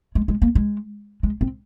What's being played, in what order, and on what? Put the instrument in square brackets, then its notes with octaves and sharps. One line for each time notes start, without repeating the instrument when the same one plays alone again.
[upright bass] G#3
G#3
A#3
G#3
G#3
C4